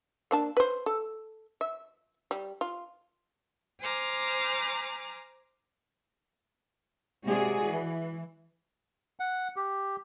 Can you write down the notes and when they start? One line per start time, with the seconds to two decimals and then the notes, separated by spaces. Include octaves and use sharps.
0.31 A#3 D4 A5
0.57 B4 C5
0.86 A4
1.61 E5
2.31 G3
2.61 F4
3.82 C5 G#5 A#5 D6 F6
7.27 C3 G#3 F#4 G#4 D5
7.65 E3
9.20 F#5
9.56 G4